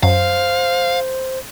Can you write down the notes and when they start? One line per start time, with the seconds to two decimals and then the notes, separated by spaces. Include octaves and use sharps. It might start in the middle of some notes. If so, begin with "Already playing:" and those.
0.03 F#2 C5 F5